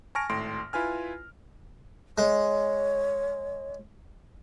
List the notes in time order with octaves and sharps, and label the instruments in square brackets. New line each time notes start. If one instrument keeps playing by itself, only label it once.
[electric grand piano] G#5 A5 C#6 F6 A#6 D7
G#1 A2 C6 D7
E4 F4 B4 G#5 F6
[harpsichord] G#3 [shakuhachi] C#5